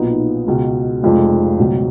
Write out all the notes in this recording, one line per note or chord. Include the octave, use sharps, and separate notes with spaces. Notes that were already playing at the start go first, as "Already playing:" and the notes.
Already playing: B1 A#2 F3 B3 D#4
C#2 B2 G#3
F1 F2 F3 G#3
C#2 B2 F#3